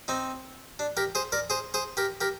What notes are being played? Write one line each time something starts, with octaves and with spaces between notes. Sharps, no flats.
C4 D#4
D4
G4 A#4
G#4 C5
A#4 D5
G#4 C5
G#4 C5
G4 A#4
G4 A#4